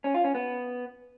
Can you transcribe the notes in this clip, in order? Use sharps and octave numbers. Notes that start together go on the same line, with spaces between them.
C#4
F4
C#4
B3